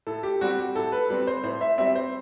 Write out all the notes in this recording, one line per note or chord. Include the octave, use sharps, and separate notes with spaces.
A2 A4
G4
G3 C4 F#4
G4
A2 A4
B4
G3 C4 B4
C5
A2 C5
E5
G3 C4 E5
C5